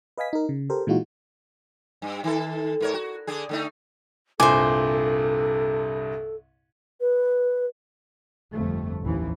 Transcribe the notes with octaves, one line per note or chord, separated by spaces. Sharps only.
B4 D#5 F5 G#5 B6
D#4 A#4
C#3
G4 A4 A#4 C5
A#2 E3 G#3 D#4 F4 F#4
G2
D#3 A4
G#2 A#4 C#5
F#4
D3 D4 G#4
D3 A3 D#4
C2 G2 A#2 A4 C5 G#5 D6
B4
G1 F2 A3
A1 D#2 A2 E3 F3